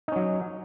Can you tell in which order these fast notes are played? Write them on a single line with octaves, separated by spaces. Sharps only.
D#4 C#4 F#3